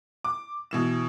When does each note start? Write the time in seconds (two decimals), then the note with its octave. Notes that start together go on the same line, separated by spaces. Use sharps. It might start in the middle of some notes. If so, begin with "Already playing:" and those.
0.24 D6
0.71 B2 E3 E7